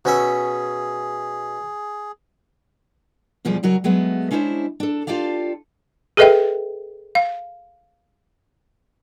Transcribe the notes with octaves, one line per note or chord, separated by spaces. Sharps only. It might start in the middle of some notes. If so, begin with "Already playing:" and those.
B2 C#4 G#4 E5
E2 B2 F3 G3 G#4 D5
C#3 F#3 F#4 A#4
F#3 G#3 A3 B3
G#3 C#4 D4 E4 C5 E5
D4 A4
F4 G4 A4 D5 F5
G#4 A4 B4 D#5 E5 G5
F5